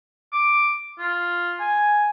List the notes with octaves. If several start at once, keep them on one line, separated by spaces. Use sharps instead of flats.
D6
F4
G#5